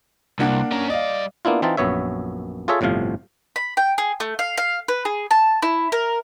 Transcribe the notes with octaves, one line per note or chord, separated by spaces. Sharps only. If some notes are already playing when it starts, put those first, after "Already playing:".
C2 A#3 D4 F#5
C#4 A#4
G2 D5 D#5 F5
A#3 B3 D4 E4 F4
E3 C4 D#4 F4 A5
A#1 F#2 B3 C#5 E5
F4 G#4 A4 C#5 E5
G1 A2 C3 F3 F5
B5
G5
G#4
A3
F5
F5
B4
G#4
A5
E4
A#4